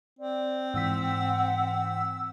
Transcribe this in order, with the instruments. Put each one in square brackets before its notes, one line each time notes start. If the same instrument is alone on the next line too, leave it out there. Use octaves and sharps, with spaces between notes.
[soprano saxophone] C4 [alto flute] D5
[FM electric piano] G#2 E3 B6 [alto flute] F#5 [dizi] E6
[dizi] E6